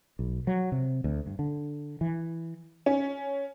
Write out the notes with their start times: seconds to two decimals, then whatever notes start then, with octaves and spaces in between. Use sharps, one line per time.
0.19 B1
0.47 F#3
0.72 C3
1.04 D2
1.27 G2
1.39 D3
2.01 E3
2.86 C#4